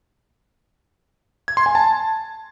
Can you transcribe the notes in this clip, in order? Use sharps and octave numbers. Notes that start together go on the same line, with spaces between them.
G#6
C6
G#5
A5